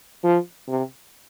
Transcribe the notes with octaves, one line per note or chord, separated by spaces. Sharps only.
F3
C3